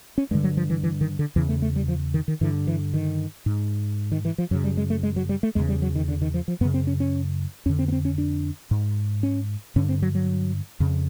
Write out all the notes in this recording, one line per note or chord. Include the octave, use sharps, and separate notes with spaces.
C#4
G2 D3 G#3
F#3
F3
E3
E3
D#3
D3
E2 C#3 E3
A3
A3
G3
F3
D#3
D#3
G2 D3 E3
E3
D#3
G#2
D#3
E3
F3
F#2 C#3 F#3
G3
G#3
A3
G#3
F#3
G3
A3
E2 C#3 G#3
G3
F#3
D#3
D3
D#3
F3
F3
F#2 C#3 B3
C4
C#4
C#4
F2 D3 C#4
C4
B3
C4
C#4
D4
G#2
C#4
G2 D3 C#4
C4
F#3
F#3
F2 C#3